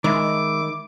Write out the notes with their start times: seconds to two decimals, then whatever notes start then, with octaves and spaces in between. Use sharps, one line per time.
0.04 D#3 G#3 E5 B5 D6 E6